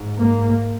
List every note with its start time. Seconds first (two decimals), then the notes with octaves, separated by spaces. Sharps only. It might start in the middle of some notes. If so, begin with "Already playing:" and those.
Already playing: G#2
0.19 A#3